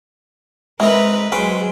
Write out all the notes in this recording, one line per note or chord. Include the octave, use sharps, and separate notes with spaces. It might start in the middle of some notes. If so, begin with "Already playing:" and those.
G#3 C4 D#4 E4 A#4 B4
F#3 G#3 C#4 B4 C5 G5